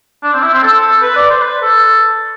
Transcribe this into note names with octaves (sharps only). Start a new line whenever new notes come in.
D4
C4
E4
C4
A4
B4
D5
C5
B4
A4